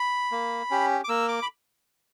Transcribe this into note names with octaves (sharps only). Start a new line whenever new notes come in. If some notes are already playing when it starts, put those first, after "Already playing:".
Already playing: B5
A#3
C#4 G4
D6
A#3 E6
D6
B5